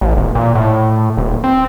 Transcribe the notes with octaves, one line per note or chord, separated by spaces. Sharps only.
A1
D#1
A#2
A2
D#1
C4